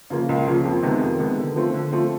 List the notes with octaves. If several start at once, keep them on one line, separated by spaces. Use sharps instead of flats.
C#3 F3 A#3
C#2
C#3 F3 A#3
F2
C3 D#3 G#3 B3
F2
C3 D#3 G#3 B3
D3
F3 A3 C4
D3
F3 A3 C4